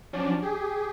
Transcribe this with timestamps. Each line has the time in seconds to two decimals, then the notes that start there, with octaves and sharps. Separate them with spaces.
0.13 F3 F#3 C#4 D4 D5
0.42 G4 G#4